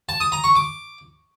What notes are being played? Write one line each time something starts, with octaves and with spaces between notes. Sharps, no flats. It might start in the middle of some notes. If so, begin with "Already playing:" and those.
A5
D#6
A#5
C#6
D6